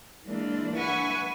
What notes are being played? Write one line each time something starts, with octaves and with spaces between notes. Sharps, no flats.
E3 G#3 A#3 D4
B4 E5 F#5 G#5 C#6